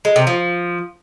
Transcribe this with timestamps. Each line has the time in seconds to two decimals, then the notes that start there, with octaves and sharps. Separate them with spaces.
0.05 G#3
0.16 C3
0.27 F3